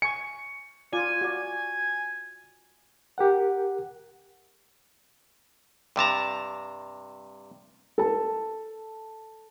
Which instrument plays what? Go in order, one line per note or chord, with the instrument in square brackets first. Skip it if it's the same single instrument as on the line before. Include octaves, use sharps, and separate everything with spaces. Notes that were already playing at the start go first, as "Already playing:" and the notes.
[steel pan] G#5 C#6 [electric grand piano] C#7
[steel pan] F4 D5 [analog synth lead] G#5
[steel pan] F#4 D5
[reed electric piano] G4 A#4 F#5
[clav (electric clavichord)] G2 C3 A5 A#5
[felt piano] A4 A5